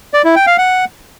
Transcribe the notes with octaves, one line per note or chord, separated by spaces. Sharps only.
D5
E4
G5
F5
F#5